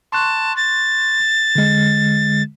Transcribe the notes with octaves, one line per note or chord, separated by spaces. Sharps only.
A5 C6 C#6 F#6
A6
D3 G#3